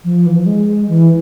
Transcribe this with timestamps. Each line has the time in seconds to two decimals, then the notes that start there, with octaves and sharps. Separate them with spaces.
0.04 F3
0.26 E3
0.36 F3
0.46 G#3
0.88 E3